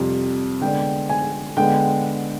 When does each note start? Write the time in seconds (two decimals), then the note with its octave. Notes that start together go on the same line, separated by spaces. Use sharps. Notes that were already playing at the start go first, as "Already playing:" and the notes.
Already playing: F2 C3 G3
0.61 D3 G#3 B3 D4 G5
1.09 G#5
1.57 D3 G#3 B3 G5